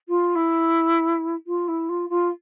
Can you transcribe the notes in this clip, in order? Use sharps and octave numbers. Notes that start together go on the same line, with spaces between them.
F4
E4
F4
E4
F4
F4